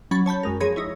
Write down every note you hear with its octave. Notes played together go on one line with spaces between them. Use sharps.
F#3 C#4 B5 A6
C#5 A5 B5 G6
F#2 G#3 A#4
F3 G#4 C#5 B5 G#6 A#6
D#4 E4 C#5